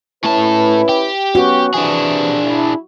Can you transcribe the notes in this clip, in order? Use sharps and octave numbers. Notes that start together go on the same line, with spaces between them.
A2 C#4 E4 A4 B4
G4
B3 C#4 F#4
C3 E3 D4 G#4
E4